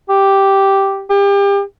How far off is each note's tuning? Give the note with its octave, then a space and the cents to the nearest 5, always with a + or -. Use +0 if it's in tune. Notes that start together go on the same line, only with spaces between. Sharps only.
G4 -5
G4 +35